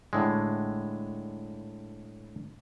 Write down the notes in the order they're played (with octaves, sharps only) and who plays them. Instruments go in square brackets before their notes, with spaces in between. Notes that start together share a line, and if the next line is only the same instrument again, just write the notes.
[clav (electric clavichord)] A2 D3 G#3